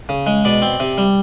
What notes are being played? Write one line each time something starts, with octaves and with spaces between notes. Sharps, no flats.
C#3
G#3
B2 D5
C4
C3
G3